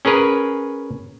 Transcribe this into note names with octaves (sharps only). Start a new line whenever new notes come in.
C#4 G#4 A#4 B4